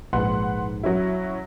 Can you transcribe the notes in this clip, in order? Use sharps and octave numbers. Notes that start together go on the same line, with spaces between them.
A#1 G#2 B4 F#5 C6
F#3 C#4 E4